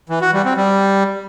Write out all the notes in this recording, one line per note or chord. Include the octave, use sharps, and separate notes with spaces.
E3
F#4
G3
C4
G3